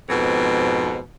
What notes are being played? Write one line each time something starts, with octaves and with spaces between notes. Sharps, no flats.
F2 G#2 B2